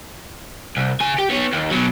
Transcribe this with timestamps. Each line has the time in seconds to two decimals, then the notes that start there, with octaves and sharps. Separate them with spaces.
0.77 C2
1.01 C#3 G#5
1.19 G4
1.30 B3 C#5
1.52 D#2
1.71 B2 F#3